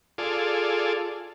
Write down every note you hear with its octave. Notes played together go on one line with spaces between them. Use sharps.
F4 G#4 A4 D5